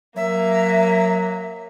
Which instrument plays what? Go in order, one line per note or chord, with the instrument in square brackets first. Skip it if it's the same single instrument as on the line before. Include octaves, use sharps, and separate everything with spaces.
[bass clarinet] F#3 [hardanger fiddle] A#3 [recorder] E5